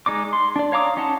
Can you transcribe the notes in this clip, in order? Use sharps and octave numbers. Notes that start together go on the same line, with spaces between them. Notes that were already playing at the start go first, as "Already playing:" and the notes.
G#3 D#4 D5 D6
C6
D4 D5
C#5 F5 A#5 D6 D#6
C#4 D#4 D#5 F#5 A5